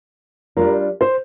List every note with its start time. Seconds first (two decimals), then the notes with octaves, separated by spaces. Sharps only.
0.57 G3 D4 F4 A#4
1.01 C5